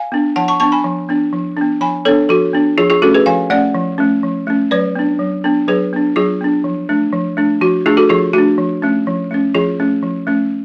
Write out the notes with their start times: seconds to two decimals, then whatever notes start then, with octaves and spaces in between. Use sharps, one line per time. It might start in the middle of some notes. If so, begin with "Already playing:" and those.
Already playing: F5 G#5
0.12 B3 D4
0.36 F3 F#5 A5
0.48 A5 C#6
0.60 B3 D4 A5 C#6
0.72 G#5 B5
0.84 F3
1.09 B3 D4
1.33 F3
1.57 B3 D4
1.81 F3 G#5 B5
2.05 B3 D4 A4 C#5
2.29 F3 F#4 A4
2.53 B3 D4
2.78 F3 F4 G#4
2.90 F4 G#4
3.02 A3 C#4 F#4 A4
3.14 G#4 B4
3.26 F3 F5 G#5
3.50 A3 C#4 D5 F#5
3.74 F3
3.98 A3 C#4
4.23 F3
4.47 A3 C#4
4.71 F#3 B4 D5
4.95 B3 D4
5.19 F#3
5.44 B3 D4
5.68 F#3 G#4 B4
5.93 B3 D4
6.16 F#3 F4 G#4
6.41 B3 D4
6.64 F3
6.89 A3 D4
7.13 F3
7.37 A3 D4
7.61 F3 F#4
7.86 A3 D4 F4 G#4
7.97 F#4 A4
8.09 F3 F4 G#4
8.33 A3 D4 F#4
8.58 F3
8.82 A3 C#4
9.07 F3
9.31 A3 C#4
9.54 F3 F4 G#4
9.80 A3 C#4
10.03 F3
10.27 A3 C#4